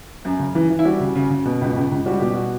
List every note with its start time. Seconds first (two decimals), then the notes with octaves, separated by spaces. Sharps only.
0.25 F#2
0.39 C#3
0.55 E3
0.70 E3
0.79 E4
0.85 G3 F#4
1.00 C#3
1.15 C#3
1.30 C#3
1.45 B2
1.61 C#2
1.77 C#2
1.92 C#2
2.06 G3 F#4
2.20 B2 G4
2.34 F#4